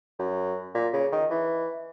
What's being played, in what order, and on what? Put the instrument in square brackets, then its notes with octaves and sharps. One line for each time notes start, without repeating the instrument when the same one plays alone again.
[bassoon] F#2
A#2
C#3
D#3
E3